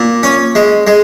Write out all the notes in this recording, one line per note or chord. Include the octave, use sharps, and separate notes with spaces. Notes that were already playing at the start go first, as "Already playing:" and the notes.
Already playing: A#2
C#4
G#3
G#3